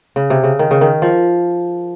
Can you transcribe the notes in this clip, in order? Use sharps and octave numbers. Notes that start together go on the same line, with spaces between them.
C#3
C3
C#3
D#3
C#3
D#3
F3